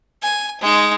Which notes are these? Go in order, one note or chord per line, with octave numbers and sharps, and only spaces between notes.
G#5
G#3 D#4